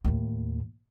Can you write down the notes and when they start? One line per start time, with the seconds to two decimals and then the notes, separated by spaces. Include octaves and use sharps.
0.04 D#2 A2